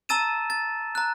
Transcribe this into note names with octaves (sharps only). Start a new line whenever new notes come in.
A5 A#5 E6 A6 D#7 E7
A6
A#5 F#6